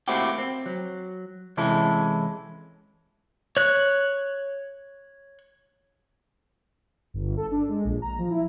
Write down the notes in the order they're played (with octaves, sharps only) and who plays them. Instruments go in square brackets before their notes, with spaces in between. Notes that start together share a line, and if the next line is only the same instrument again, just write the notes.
[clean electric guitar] A3 A#3 C4 E4 F#4 G4
C4
F#3
C3 E3 G#3 C#4 E4 A4
[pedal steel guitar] C#5 F#6
[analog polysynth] G1
A4
D4
G#3
A#1
A#5
F3
E4